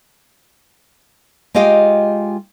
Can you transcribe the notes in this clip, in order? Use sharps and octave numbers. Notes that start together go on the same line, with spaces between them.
G#3 F4 G4 D#5 F5 G5